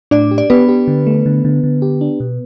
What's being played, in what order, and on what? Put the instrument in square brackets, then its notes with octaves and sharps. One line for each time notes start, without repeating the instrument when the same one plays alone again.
[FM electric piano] A2 [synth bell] D4 D5
[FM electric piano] G4
[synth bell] D5
[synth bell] B3 B4 [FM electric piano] G4
[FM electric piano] G4
D3
A3
D3
D3
D3
G4
D4
B2